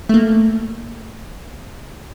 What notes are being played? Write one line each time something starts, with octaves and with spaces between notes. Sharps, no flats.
A3 A#3